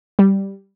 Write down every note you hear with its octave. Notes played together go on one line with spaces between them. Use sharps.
G3